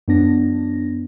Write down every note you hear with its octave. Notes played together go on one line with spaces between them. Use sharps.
F#2 B3 D4 A#6